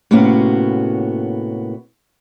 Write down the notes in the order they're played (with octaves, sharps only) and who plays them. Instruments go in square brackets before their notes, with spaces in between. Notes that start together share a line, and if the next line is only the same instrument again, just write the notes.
[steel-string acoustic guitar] A2 C3 A#3 B3 C#4 F#4